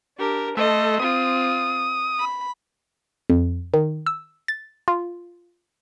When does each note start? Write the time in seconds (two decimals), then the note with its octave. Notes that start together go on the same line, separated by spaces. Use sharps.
0.17 D4 G4 A#4
0.57 A3 A4 D#5 C6
0.99 C4 F4 D#6
2.19 B5
3.30 F2
3.74 D#3
4.06 E6
4.48 A6
4.88 F4